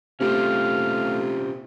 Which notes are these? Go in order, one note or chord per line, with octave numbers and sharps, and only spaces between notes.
C3 A3 C#4 F4 G4 F5